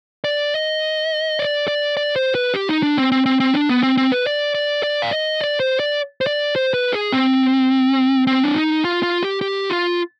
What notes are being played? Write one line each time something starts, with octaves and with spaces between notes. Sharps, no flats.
D5
D#5
D5
D5
D5
C5
B4
G4
D#4
D4
C4
C4
C4
C4
D4
B3
C4
C4
B4
D5
D5
D5
F5
D#5
D5
C5
D5
C5
D5
C5
B4
G#4
C4
C4
D4
D#4
F4
F4
G4
G4
F4